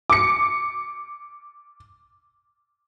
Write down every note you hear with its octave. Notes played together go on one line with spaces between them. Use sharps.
D6 C#7